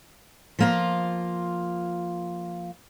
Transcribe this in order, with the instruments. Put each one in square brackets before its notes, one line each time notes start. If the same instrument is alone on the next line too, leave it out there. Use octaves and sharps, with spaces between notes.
[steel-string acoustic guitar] F3 A#3 F4